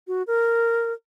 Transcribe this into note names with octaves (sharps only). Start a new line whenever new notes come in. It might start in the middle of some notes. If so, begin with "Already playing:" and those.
F#4
A#4